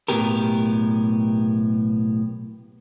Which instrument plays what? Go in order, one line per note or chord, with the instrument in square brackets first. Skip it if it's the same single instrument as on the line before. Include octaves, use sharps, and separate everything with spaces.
[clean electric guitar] B1 F2 A2 B3 G4 A#4